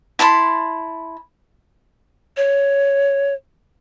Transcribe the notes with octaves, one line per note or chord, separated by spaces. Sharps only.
E4 A5 B5 C6
C#5